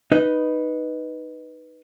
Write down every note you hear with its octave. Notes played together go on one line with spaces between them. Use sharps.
D#4 B4 D#5